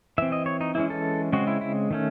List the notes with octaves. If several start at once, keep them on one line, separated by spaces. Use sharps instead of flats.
E3 C4 E5
D#5
C#5
D#4
E3 G#3 C#4 E4
A4
C#3 G#3 C4 F#4
E4
E4
D#3 A3 C#4